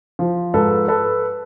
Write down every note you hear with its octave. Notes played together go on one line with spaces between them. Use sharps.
F3
G#2 A4 B4
A4 B4